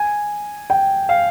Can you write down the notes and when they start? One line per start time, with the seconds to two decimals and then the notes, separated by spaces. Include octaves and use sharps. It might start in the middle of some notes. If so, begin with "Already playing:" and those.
Already playing: G#5
0.70 G5
1.09 F5